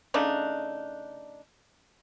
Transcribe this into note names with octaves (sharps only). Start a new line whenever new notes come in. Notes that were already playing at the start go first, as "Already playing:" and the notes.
C#3 A3 D4 D#4